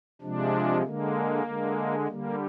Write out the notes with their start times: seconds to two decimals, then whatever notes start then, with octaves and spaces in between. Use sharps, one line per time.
0.22 C3 F3 G#3 D4
0.83 D3 G#3 A#3
1.45 D3 G#3
2.07 D3 G3 A#3